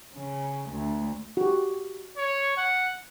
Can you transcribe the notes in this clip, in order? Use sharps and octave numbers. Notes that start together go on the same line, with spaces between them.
C#3
D2
F#4 G4
C#5
F#5